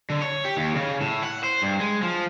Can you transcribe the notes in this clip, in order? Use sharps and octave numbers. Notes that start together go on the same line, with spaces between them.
D3
C#5
G4
D#2
C#3
A2
F#5
C5
G2
G#3
F3